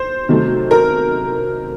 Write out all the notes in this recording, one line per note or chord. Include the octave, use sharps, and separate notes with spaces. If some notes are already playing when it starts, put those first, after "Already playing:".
Already playing: C5
C3 D#3 F#3 A3
A#4